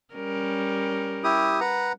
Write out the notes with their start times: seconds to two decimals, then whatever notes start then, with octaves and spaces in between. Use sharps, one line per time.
0.14 G3 C#4 A#4
1.24 E4 G4 D#6
1.61 B4 F#5 A#5